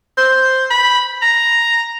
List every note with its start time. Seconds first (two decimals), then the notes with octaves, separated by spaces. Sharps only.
0.18 C5
0.71 B5
1.22 A#5